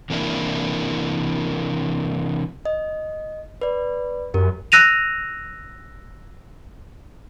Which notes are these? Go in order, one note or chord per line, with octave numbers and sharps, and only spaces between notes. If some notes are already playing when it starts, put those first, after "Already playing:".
C3 E3 A#3 D4 E4 A#4
D#5
B4 D5
F#2 G4 A#4
E6 F#6 A#6 D#7 F7